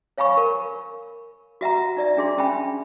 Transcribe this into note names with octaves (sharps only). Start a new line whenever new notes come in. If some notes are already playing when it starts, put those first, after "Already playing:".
C#5 F5 G#5 B5 C#6
A#4
F#4 E5 F#5 A#5
D#4 D5 E5
D4 G#4 C6
C#4 E5 G5 G#5 B5